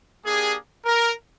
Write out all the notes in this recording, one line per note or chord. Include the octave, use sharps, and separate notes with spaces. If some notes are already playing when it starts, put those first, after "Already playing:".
A#3 D4 G4 G#4
A#4